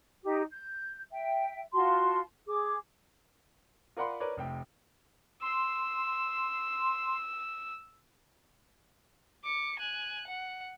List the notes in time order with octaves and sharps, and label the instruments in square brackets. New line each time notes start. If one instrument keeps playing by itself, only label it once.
[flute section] D#4 G4
G6
E5 G5
F4 F#4 A5 C6
G#4 D6
[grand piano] F4 A#4 D5 F#5 B5 C6
A#4 B4 C#5 D5
F1 C3 G5
[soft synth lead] C6 [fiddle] E6
[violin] D6 C#7
G#5 F#6
F#5